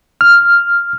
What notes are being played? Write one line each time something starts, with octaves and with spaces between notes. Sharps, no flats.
F6